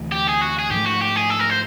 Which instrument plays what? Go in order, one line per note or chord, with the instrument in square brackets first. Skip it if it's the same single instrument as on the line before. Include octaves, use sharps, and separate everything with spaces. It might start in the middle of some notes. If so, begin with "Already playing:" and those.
Already playing: [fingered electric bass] D2 C3 E3 A3
[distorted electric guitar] G4
G#4
F#4
G#4
[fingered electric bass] G#2 F3 A3 [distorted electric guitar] G4
[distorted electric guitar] F#4
G4
G#4
A4
A#4
C5